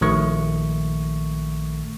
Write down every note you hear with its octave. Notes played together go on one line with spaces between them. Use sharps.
A#1 D#3 A3 C#6